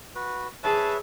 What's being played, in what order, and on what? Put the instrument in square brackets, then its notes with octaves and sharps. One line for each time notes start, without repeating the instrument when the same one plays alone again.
[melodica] F#4 B4
[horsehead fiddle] G#4 A5 [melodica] B4 C#5 E5